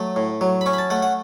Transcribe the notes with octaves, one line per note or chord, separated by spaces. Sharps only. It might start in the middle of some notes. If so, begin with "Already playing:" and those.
Already playing: F#3 A3
A2
F#3
B5
C#4 C#6
B5
A5
A3 F#5
F#5